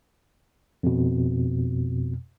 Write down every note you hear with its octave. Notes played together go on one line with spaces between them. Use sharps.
F2 B2